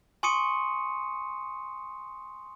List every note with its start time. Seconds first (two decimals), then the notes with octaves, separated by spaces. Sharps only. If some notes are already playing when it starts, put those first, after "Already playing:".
0.23 G#5 C6 C#6 D#6 C#7 D#7